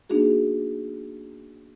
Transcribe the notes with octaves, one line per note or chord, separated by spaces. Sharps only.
A#3 B3 D4 D#4 F#4 G#4